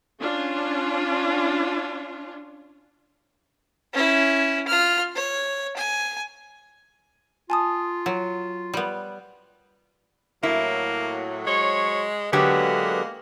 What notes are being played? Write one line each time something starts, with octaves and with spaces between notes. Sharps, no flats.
C#4 D4 F4
C#4 E4
F4 F6
C#5
G#5
F4 G#5 A5 D#6
F#3
G3 B3
A2 F#3 A#3 E4
F#3 G#3 C5 C#5
D3 F#3 G#3 A#3 B3 G4